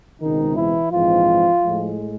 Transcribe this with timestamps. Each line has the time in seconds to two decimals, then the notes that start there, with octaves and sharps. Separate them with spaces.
0.21 C#2 B2 D#3 G#3 C4 D#4
0.56 E3 E4
0.91 A#1 G#2 E3 F3 G#3 C4 F4
1.62 A2 F3 G#3